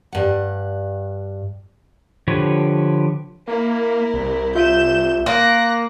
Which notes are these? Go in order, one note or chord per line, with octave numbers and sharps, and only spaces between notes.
G2 F#5
D3 F3 G4 B4 C#5
A#3 E4 A#4
C2
F4 E5 G6 E7
A#3 C6 F#6 A#6